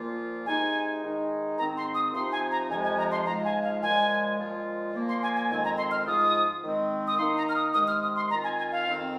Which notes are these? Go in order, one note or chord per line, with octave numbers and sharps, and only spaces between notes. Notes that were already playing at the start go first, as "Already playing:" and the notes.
Already playing: A#2 F3 A#3 F4
C3 G#3 D#4 G#5
D#3 G#3 D#4
G#2 D#3 C4 A#5
C6
D#6
C3 F3 C4 D#4 C6
G#5
A#5
F2 C3 F3 G#3 G#5
G#5
A#5
C6
G#2 F3 G#3 F4 A#5
G#5
F5
A#2 F3 G#3 G#5
A#2 F3 G#3 F4
A#2 F3 A#3
C6
G#5
G#5
F2 D#3 G#3 C4 G#5
A#5
C6
F6
G#2 F3 G#3 F4 D#6
D#3 G#3 C4
D#6
D#3 A#3 D#4 C6
A#5
F6
D#6
C3 D#3 G#3 D#6
F6
D#6
C6
D#3 C4 F4 A#5
G#5
G#5
F5
F2 D#3 C4